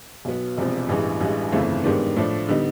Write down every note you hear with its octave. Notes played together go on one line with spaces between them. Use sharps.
B1 B2 F#3 B3
E1 E2 C3 F3
A1 G2 E3 G#3
A1 G2 E3 G#3
G1 F2 C#3 E3 A3
G#2 D#3 G3 B3 D4
A2 F3 A3 D4
D3 G3 B3 D#4